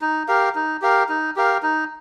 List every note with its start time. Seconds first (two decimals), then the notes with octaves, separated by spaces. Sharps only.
0.01 D#4
0.28 G4 A#4 F5
0.55 D#4
0.82 G4 A#4 F5
1.09 D#4
1.36 G4 A#4 F5
1.63 D#4